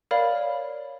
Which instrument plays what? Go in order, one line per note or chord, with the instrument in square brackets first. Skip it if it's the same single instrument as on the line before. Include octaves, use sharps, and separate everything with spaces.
[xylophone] A#4 C#5 D5 F5 B5